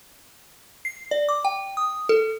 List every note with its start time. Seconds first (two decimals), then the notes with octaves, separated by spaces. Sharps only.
0.85 C7
1.11 D5
1.29 D6
1.45 G5
1.77 D#6
2.09 A4